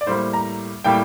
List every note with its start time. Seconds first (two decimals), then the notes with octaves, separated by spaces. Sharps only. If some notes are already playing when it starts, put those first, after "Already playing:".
0.01 D5
0.06 A2 G3 A#3 C5
0.33 A#5
0.84 A2 G3 A#3 G5